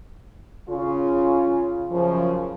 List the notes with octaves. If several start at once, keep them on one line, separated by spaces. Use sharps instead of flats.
C#3 C#4 F4
F#2 C#3 F3